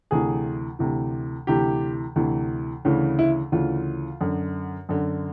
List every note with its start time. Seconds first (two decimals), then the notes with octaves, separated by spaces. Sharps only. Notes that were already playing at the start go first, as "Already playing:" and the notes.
0.11 D2 C3 E3 G#4
0.79 D2 C3 E3
1.47 D2 C3 E3 G4
2.16 D2 C3 E3
2.85 D2 C#3 E3
3.19 E4
3.52 D2 C#3 E3 F4
4.21 F#2 D3
4.89 F#2 D3